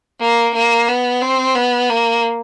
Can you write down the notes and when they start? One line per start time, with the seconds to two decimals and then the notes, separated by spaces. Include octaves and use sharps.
0.21 A#3
0.55 A#3
0.88 B3
1.21 C4
1.55 B3
1.90 A#3